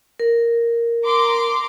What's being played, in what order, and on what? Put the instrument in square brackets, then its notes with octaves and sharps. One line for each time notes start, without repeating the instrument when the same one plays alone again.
[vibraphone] A#4
[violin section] A#5 C6 D6